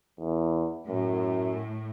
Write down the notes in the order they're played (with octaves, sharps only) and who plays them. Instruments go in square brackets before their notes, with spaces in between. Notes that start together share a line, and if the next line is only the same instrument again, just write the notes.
[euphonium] E2
[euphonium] F#2 [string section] A2